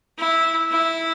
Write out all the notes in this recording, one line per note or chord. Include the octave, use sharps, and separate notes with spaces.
E4
E4